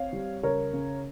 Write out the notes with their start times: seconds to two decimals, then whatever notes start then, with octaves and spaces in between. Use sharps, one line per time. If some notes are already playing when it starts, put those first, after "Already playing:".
Already playing: C4 C#5 F5
0.13 G3
0.43 C#3 A#4 C#5
0.73 C#3